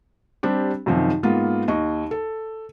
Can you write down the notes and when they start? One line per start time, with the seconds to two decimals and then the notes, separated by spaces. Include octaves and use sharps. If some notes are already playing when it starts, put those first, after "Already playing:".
0.43 G3 C4 D4 G4
0.86 F#2 C3 D#3 F3
1.23 G#2 A#3 B3 F4
1.68 D#2 D#5 C#6
2.11 A4